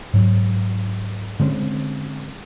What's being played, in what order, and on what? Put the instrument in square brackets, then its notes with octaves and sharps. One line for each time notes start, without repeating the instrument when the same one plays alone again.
[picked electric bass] G#2 F#3
D3 G#3 C4 C#4